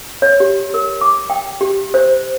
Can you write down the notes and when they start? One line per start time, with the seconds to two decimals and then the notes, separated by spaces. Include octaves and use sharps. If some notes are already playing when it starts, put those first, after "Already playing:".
0.22 C#5
0.40 G4
0.74 A#4
1.01 D6
1.30 G5
1.61 G4
1.94 C5